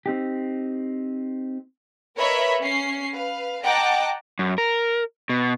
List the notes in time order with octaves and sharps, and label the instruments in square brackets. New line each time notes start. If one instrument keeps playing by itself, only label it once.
[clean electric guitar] C4 D#4 G4
[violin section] A#4 B4 C#5 D#5 E5 B5
C#4 C7
B4 F5
D#5 F#5 G5 A5 A#5 D6
[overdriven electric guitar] F#2
A#4
B2